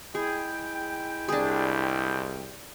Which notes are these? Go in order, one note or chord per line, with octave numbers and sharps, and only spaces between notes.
G#3 E4 G#4 G5
C2 D4 G#4